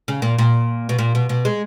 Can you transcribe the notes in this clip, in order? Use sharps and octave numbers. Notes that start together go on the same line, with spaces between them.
C#3
A#2
A#2
B2
A#2
B2
B2
G#3